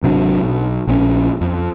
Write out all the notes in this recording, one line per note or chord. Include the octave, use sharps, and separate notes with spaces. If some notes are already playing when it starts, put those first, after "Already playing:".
G#1 C3 F#3 D4
B1
A#1 C4 C#4
F2